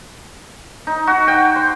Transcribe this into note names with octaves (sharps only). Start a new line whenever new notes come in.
D#4
F#4
G5
C6